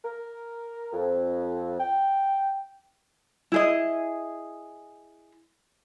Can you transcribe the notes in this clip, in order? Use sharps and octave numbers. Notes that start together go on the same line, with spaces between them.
A#4
F2
G5
E4 G#4 D#5